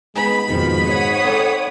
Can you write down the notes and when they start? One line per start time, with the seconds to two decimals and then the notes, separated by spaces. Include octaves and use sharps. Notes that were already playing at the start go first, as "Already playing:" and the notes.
0.16 G#3 B3 D#4 G#4 B5
0.49 F2 G#2 B2 D#3 F3
0.86 C#5 F#5 D#6
1.25 C4 D#4 A4 D5